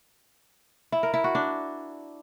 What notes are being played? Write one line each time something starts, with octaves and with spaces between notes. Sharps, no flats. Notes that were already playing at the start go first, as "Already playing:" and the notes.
E4
A#4
E4
F#4
D4